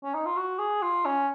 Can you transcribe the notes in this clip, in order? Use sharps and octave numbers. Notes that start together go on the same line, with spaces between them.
C#4
D#4
F4
F#4
G#4
F4
C#4